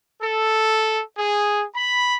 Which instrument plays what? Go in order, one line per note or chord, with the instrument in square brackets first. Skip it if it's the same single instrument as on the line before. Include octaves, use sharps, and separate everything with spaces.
[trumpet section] A4
G#4
B5